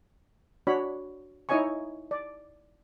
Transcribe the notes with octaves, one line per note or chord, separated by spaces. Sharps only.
D4 F#4 C#5 B5
D#4 E4 C#5 D#5 G#5 C#6
D5